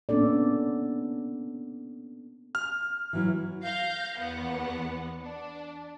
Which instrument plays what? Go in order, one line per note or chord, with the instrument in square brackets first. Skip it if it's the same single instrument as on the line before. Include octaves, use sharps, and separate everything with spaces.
[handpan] A#3 B3 C#4 D4 A4 D5
[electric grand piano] F6
[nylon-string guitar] E3 F#3 E4
[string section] F5 G6 A#6
E2 B3 F#5
D4